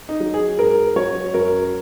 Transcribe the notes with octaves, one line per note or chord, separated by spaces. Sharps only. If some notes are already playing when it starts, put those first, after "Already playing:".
D#4
F#3
G#4
G#2 A#4
F#3 C#5
F#2 A#4